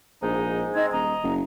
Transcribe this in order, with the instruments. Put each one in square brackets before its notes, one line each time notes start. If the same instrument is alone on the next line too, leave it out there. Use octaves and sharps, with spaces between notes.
[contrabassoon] A#1 [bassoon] G#2 [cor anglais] D#4
[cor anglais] C4 [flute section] D#4 D#5 G#6
[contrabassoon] D#1 [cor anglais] D#5 [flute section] A#5
[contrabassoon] F#1